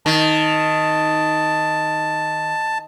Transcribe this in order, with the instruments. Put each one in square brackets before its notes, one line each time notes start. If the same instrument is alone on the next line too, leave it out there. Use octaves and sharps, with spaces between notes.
[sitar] D#3 [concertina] A5